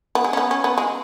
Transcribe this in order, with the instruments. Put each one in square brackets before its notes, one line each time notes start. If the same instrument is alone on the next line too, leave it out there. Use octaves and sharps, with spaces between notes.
[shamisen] B3
G#3
C#4
B3
C#4
B3
G#3